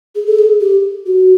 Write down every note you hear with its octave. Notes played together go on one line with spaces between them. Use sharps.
G#4
A4
G#4
G4
F#4